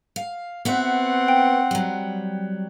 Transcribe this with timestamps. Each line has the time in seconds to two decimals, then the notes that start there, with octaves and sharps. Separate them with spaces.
0.16 F5
0.65 B3 C4 F#4 E5 F#5
1.28 G5
1.71 F#3 G3